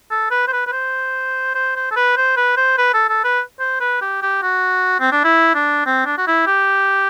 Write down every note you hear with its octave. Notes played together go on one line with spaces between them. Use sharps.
A4
B4
C5
B4
B4
C5
C5
C5
A4
B4
C5
B4
C5
B4
A4
A4
B4
C5
B4
G4
G4
F#4
C4
D4
E4
D4
C4
D4
F#4
E4
G4